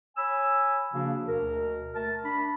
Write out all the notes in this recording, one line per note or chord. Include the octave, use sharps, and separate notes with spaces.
C#5 G#5 B5 E6
C#3 F3 A#3 D4 F#4 G#4
D2 B2 A#4
A3 A#4 A5
D4 B5